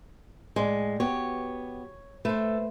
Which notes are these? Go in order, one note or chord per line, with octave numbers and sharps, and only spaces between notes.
A2 G#3 D5
B3 F#4 G4 C#5
A3 B4 C5